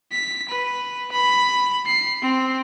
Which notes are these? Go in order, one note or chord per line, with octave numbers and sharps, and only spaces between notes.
B6
B4
B5
C7
C4